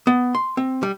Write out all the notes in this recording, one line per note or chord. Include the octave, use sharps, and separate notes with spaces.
B3
C6
C4
G3